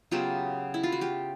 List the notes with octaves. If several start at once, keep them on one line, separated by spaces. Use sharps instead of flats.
C#3 F#3 B3 F4 G4
E4
F4
F#4
F4 G4